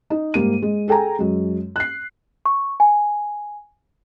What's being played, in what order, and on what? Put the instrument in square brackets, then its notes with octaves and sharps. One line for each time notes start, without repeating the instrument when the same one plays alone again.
[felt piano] D#4
G#2 G3 A#3 D#7
G#3
G#4 A4 G5 G#5 A#5
F#2 G#3
F#6 C7
[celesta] C#6
G#5